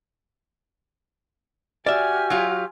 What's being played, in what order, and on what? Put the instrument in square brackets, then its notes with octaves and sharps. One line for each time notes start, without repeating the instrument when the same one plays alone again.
[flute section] F#4 G4 F6 [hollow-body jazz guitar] D5 E5 [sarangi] G#5
[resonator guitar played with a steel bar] F#3 F4